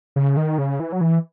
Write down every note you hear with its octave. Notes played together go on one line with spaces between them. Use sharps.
C#3
D#3
C#3
E3
F#3
E3